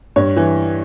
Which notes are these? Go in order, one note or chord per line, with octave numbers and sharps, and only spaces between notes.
G2 C#5
E3